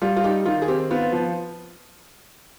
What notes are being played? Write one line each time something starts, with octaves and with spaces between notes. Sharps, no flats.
G3 F4
F4
D#4 G4
D#3 F4
G#4
C4 G4
B3 F4
F3